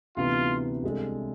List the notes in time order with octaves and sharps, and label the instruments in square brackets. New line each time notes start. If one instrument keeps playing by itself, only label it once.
[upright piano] D2 C3 E3 B3 [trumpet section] F4
[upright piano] C2 C3 G#3 D4 A4